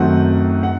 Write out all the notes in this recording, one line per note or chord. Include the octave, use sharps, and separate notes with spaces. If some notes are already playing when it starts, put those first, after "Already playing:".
Already playing: F#2 D#3 A3 C4 D#4 F#5
F#5